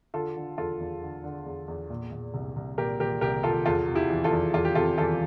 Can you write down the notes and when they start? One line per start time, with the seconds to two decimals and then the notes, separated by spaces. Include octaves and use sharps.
0.14 D3 F4 A4
0.36 D3
0.58 E2 F4 A4
0.80 E2
1.02 D3
1.24 D3
1.46 E2
1.68 E2
1.90 A#2
2.12 A#2
2.34 C2
2.56 C2
2.78 A#2 G4 A#4
3.00 A#2 G4 A#4
3.21 C2 G4 A#4
3.43 C2 F4 A4
3.66 E2 F4 A4
3.88 C3
3.95 E4 G4
4.10 E3
4.24 F4 A4
4.32 E2
4.53 E2 F4 A4
4.65 G4
4.75 C3 F4 A4
4.98 E3 F4 A4